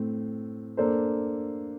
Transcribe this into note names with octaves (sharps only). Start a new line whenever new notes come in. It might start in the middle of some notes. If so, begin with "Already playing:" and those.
Already playing: A2 A3 C4
A#3 D4 A4 C5